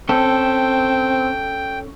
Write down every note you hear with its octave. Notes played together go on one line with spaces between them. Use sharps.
C4 C#4 A4 G5